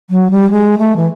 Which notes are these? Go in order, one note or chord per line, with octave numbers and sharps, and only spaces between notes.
F#3
G3
G#3
A3
E3